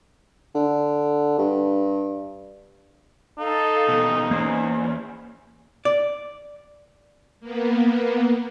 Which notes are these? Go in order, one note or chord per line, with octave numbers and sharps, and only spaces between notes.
D3
G2
D#4 A4 F5
D#2 B2
E2 A#3 C#4 C5 G#5
D5
A#3 B3